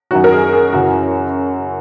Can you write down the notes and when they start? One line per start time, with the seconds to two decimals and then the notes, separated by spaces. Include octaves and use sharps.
0.11 F#2 D#3 F#3 F#4
0.24 A#4
0.32 G#4
0.53 G#4
0.73 F#2 C#3 E3 F#4